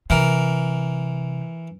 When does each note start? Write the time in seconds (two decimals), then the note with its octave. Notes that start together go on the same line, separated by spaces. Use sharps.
0.10 C3 E3 A#4